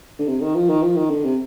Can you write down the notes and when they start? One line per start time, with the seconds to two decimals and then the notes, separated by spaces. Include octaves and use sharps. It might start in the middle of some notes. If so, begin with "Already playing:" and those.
0.19 D3
0.28 C3
0.41 D#3
0.55 F3
0.69 D#3
0.82 F3
0.97 D#3
1.10 D3
1.24 C3